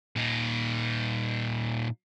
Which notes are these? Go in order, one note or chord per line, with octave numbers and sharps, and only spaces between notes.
A#2 D#4